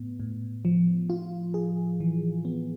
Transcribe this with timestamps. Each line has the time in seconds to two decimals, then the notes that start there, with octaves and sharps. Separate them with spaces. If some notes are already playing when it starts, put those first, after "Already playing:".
Already playing: A2 B3
0.20 A2
0.65 F3
1.10 F4
1.54 G#4
2.00 E3
2.45 B3